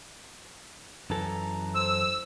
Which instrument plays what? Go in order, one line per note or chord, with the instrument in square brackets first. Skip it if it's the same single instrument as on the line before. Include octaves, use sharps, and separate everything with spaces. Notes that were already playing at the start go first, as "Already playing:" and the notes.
[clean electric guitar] F#2 E3 A4 [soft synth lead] A#5
[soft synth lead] C5 [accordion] E6